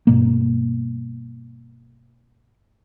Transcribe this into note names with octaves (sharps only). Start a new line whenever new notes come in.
G2 B2 A#3